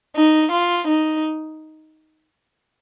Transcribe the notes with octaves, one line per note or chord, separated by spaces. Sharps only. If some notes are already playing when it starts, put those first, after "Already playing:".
D#4
F4
D#4